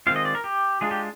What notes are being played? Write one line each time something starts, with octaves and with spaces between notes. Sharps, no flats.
D#3 G#3 C4 F4 F5
D#5
D5
A#4
G4
G#3 D4 F4 G#4
G4